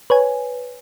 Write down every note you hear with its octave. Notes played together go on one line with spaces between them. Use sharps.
B4 C#5 G#5